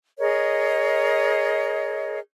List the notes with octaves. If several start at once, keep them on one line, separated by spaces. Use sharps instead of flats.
G#4 A#4 C#5 D#5